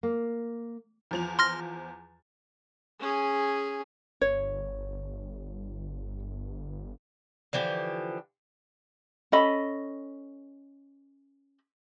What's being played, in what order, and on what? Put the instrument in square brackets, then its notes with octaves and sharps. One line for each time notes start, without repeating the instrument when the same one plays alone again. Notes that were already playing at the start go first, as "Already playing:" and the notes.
[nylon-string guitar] A#3
[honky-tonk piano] E2 F3 F7
[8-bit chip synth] C6 F6 A#6
[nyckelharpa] C#4 G#4
[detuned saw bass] G1 [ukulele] C#5
[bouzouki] D3 E3 F3 G4
[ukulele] C#4 A4 D#5 B5